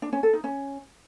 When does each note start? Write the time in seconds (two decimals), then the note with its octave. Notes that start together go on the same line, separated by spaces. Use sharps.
0.02 D4
0.13 C#4
0.23 A4
0.33 D#4
0.44 C#4